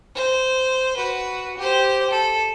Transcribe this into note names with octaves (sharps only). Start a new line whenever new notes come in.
C5
F#4 B4
G4 C5
A4